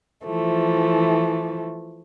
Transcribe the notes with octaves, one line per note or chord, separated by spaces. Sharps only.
E3 F3 A3